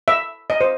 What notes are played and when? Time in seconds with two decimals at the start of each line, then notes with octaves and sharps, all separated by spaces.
0.08 E5
0.50 D#5
0.61 C5